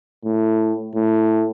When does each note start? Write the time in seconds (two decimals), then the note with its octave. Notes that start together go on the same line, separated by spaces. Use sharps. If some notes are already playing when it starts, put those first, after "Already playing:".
0.25 A2
0.95 A2